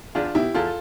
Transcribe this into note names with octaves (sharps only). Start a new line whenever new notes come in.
E2 D4 F4
B2 E4 G4
E2 F4 A4